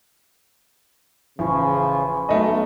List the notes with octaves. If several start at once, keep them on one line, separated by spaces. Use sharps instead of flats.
A1 C#3 F3 G#5 B5 C#6
B1 A3 D#5